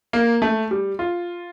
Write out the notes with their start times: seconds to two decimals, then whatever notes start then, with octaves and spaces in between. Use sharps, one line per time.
0.13 A#3
0.42 A3
0.71 G3
0.99 F4